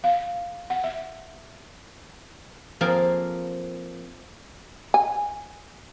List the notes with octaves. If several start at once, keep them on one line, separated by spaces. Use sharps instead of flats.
F5
F#5
E5
F3 A#3 C4 F4 G#4 A4
G#5